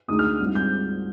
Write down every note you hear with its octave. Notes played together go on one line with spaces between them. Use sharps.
D2 D3 G#3 D#4 D#6
F6
G#2 G3 C4 F4
G6